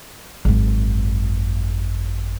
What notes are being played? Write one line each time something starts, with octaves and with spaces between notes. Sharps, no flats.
G#1 F#2